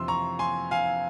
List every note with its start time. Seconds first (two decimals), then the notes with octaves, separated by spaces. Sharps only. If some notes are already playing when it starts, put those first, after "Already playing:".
Already playing: F2 C3 E3 C6 E6
0.08 A#5 C#6
0.39 G#5 C6
0.71 F5 G#5